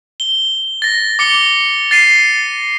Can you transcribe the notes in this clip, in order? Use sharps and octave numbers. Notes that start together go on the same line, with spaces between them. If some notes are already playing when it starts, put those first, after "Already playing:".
G7
A6 A#6
D6 C#7 G7
A6 C7 D#7